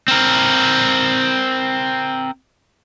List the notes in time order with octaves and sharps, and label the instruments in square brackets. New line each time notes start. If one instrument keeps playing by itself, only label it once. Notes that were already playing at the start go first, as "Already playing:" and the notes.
[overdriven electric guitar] C4 A#4